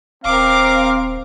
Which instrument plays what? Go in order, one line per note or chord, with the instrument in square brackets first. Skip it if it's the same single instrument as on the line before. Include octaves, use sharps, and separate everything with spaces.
[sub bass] D#1 [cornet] C4 [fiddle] A#4 D6 [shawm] F5